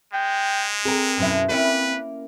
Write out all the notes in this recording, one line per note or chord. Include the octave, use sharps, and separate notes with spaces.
G#3 G5
C4 G#4 A#4
F#2 B2 E4
A#3 C4 C#4 E4 B4